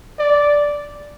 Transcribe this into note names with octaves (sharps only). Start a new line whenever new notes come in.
D5